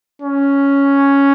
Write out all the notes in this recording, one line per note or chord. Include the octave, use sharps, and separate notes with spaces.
C#4